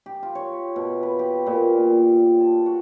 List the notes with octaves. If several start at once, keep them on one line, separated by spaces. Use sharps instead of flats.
G4
F4
C#5
B2
B4
G4
A#2
A5
F#4